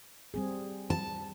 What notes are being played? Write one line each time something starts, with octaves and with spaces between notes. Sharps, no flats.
G3 C4 G#4
A5